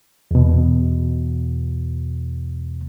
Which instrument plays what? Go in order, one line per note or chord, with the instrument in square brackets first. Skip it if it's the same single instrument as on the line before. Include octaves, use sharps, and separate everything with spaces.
[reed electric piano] E2 B2